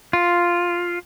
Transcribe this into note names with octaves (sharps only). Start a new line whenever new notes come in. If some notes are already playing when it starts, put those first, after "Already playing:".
F4